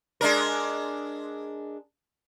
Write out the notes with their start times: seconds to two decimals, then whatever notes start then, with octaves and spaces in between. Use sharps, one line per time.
0.21 G#3 D4 A#4